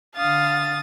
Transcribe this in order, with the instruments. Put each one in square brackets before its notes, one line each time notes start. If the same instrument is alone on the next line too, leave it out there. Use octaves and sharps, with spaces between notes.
[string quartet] D3 D#6 A6 [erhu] F5